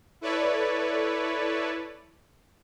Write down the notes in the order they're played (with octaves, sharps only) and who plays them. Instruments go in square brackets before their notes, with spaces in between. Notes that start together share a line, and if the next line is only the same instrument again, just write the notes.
[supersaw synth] E4 A4 B4 C#5 D5